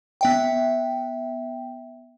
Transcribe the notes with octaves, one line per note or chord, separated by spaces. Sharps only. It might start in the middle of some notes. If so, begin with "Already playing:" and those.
B3 E5 G5